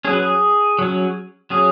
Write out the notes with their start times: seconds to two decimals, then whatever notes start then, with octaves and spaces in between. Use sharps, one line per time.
0.05 F#3 C#4 G#4
0.13 B4
0.22 G#4
0.79 F#3 C#4
1.50 F#3 C#4 G#4